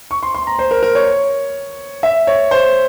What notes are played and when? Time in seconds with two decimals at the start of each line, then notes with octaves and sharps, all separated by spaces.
0.11 C#6
0.23 C6
0.35 C6
0.47 A#5
0.59 C5
0.71 A#4
0.83 A#4
0.95 C#5
2.03 E5
2.27 C#5
2.51 C5